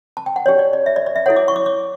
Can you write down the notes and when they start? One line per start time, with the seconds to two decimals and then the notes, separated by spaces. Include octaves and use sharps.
0.17 A5
0.26 G5
0.36 F#5
0.46 D4 G4 C#5 D5
0.59 D5
0.73 D5
0.86 E5
0.96 D5
1.06 D5
1.16 E5
1.26 E4 A4 C#5 F#5
1.36 D6
1.48 C#6
1.56 D6
1.66 D6